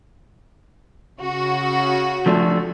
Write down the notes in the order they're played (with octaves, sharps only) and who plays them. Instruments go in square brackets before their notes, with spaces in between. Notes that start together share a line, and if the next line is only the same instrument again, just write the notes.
[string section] C#3 F#4
[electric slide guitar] F3 A3 D4